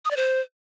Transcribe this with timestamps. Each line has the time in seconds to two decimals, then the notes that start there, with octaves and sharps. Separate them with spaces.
0.05 D#6
0.11 D5
0.17 C5